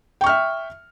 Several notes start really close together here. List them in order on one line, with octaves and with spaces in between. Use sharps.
G5 C#6 F6 E5